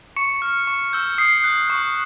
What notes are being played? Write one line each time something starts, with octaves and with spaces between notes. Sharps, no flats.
C#6 C#7
F6
C#6
E6 G6
D#6 C7
F#6
C#6